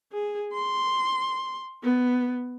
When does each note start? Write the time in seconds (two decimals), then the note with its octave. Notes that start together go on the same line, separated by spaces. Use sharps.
0.12 G#4
0.53 C6
1.83 B3